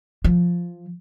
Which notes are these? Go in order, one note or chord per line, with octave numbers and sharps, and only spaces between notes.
F3